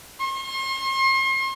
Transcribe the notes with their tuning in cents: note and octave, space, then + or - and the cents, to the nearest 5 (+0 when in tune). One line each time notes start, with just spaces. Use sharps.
C6 +40